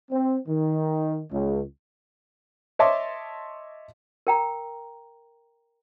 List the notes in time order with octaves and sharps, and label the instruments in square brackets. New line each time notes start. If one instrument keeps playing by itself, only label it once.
[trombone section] C4
D#3
C#2
[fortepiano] C#5 D#5 E5 A5 C6 D6
[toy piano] A#4 G5 A#5